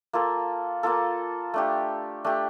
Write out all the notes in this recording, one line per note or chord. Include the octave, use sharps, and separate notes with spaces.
A#3 F4 A4
A#3 F4 A4
A3 D4 G4
A3 D4 G4